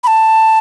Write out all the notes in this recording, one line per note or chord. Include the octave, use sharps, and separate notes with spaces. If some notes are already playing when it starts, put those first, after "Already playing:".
B5
A5